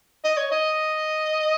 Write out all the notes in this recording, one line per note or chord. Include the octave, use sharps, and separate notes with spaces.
D#5
C#5
D#5